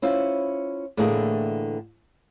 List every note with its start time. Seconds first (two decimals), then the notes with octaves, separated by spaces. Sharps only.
0.02 C#4 E4 F4 C5
0.97 A2 D3 E3 A3 A#3 G#4